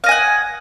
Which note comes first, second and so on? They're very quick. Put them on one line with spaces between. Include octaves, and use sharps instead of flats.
F5 D#5 G#5 F#5